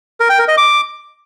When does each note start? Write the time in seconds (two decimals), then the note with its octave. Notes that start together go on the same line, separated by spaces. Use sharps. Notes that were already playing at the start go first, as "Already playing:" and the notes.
0.20 A#4
0.30 G5
0.39 A#4
0.48 D#5
0.57 D6